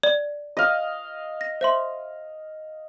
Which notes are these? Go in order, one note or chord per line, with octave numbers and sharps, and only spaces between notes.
D5
D#5 F5
A#6
C5 E5 C6